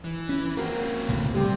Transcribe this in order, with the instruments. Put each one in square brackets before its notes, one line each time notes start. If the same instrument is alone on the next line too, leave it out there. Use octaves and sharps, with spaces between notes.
[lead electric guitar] E3
[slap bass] C#4
[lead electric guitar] A#3 C4 [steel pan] F#4 A#4
[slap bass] C#2 A2 D3
[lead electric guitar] C3 [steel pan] G3 G4